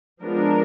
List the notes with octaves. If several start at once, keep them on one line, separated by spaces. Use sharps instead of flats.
F3 G#3 B3 D4 A#4